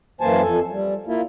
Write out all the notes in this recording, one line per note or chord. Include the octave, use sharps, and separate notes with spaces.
F#2 E3 A#3 C5 G#5 A5
F2 A4 G#5
G3
A#3 E4 F4